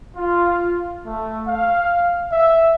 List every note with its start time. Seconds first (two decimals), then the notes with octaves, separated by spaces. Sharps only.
0.16 F4
1.06 A3
1.47 F5
2.32 E5